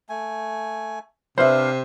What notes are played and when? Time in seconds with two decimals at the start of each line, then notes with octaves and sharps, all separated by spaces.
0.09 A3 G#5
1.38 C3 D4 B4 C5 E5 F5